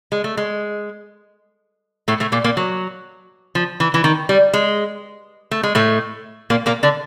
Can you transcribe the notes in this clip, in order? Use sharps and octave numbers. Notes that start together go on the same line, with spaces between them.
G#3
A3
G#3
A2 A3
A2 A3
A#2 A#3
A#2 A#3
F#3
F3
E3
E3
D#3
G3
G#3
A3
G#3
A2 A3
A#2 A#3
A#2 A#3
D3 D4